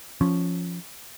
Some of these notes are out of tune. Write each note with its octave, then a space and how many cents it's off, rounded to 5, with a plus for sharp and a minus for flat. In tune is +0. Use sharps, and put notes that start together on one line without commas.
F3 +0 C#4 +0